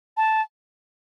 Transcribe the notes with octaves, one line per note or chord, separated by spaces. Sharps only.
A5